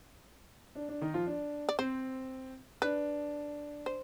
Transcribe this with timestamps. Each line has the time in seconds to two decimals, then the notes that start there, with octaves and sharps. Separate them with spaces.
0.75 D4
0.89 D4
1.01 D#3 D#4
1.14 F3 F4
1.27 D4
1.69 D5
1.79 C4 C5
2.82 D4 B4
3.86 C5